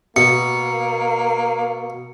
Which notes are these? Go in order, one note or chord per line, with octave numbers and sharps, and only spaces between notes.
B2 A#3 C#7